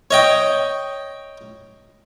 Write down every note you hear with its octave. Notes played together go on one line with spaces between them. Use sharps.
C#5 D#5 G5